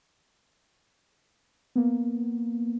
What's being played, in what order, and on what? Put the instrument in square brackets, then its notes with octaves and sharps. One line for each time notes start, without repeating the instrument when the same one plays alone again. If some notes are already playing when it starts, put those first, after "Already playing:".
[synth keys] A#3 B3